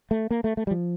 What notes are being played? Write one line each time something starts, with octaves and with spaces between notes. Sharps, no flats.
A3
A#3
A3
A3
G3
F3